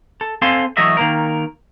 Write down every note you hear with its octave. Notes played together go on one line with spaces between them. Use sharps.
A4
C4 A4 F5 G#5 C6
E3 F#3 A3 D#5 E5
D#3 A#3 A#4